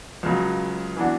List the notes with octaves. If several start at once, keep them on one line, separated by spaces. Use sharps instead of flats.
C#2 C#3 F#3
E3 B3 D4 F#4